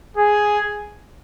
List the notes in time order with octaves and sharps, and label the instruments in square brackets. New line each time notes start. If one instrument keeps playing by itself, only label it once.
[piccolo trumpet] G#4